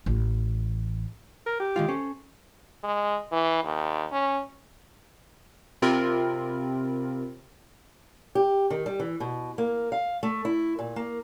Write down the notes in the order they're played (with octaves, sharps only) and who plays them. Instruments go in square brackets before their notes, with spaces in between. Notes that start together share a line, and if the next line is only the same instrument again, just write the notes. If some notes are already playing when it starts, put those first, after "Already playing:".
[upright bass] A1
[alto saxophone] A#4
G4
[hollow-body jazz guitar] D#3 G#3 F4
C#4 A4 C5
[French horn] G#3
E3
D#2
C#4
[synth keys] C3 C4 F4 A#4 B5
[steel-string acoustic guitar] G4
D#3
G3
E3
B2
A#3
F5
A3
E4
A#2
A#3